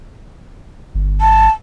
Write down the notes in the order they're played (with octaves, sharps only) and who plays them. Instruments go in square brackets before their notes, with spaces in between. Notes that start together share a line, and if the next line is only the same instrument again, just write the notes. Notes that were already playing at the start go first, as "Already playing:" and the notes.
[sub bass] G1
[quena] A5